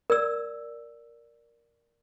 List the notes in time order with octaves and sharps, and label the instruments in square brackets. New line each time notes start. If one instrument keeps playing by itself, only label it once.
[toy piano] A#4 D5 E6